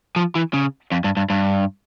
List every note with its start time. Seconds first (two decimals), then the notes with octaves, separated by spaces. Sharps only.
0.16 F3
0.35 E3
0.54 C#3
0.92 F2
1.04 G2
1.17 G2
1.30 G2